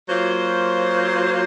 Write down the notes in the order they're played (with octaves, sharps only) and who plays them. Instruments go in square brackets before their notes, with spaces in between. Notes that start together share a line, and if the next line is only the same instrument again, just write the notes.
[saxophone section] F#3 A#3 F4 C5